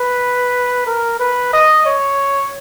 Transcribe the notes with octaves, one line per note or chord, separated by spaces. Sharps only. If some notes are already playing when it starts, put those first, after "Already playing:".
Already playing: B4
A#4
B4
D#5
C#5